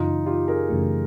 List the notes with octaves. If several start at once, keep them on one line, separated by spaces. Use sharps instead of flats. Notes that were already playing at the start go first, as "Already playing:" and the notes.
Already playing: F#2 C#3 E3 D#4 F4
F4 G4
G#4 A#4
F#2 C#3 E3 A3